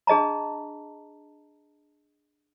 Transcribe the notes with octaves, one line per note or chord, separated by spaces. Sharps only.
D4 G#4 D#5 A5 A#5